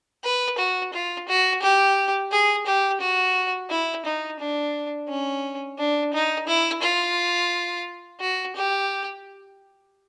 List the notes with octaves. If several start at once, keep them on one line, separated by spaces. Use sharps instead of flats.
B4
F#4
F4
F#4
G4
G#4
G4
F#4
E4
D#4
D4
C#4
D4
D#4
E4
F4
F#4
G4